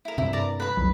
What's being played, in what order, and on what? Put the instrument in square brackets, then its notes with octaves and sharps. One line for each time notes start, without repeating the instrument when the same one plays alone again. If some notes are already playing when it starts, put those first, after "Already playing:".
[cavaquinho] E4 A#4
[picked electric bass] G2 C3 [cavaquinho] E4
[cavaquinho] A#4 D5 A#5
B4 B5
[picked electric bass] F1 C2 F#3